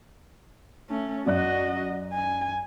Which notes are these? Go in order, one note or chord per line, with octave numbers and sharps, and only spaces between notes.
A3 C#4
F#2 F#4 D5 D#5 F#6
G#5